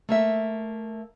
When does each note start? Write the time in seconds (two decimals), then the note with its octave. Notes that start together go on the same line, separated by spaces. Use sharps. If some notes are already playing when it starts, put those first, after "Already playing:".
0.09 A3 A#3 E5